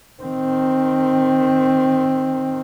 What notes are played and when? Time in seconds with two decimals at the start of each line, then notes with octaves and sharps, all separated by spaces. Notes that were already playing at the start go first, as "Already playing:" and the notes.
0.23 D#3 C4